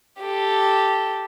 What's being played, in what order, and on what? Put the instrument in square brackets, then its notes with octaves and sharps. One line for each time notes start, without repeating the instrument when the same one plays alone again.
[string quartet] G4 A4